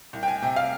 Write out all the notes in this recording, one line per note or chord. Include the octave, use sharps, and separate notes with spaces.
C2
G5
G#5
C3 G5
F5